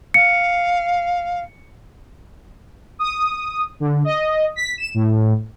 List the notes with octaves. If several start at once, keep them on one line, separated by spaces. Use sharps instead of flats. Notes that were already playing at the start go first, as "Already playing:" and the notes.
F5 C#7
D#6
D3
D#5
B6
E7
A2